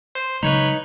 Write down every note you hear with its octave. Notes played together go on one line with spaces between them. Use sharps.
C5
C#3 F#3 G#3 D#4 B4 C#5 B5